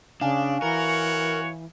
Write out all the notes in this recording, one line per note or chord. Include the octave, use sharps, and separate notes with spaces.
C#3 D4 F5 G#5
E3 F#4 A#4 C#5